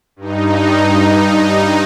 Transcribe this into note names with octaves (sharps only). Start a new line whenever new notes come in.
G2 D#4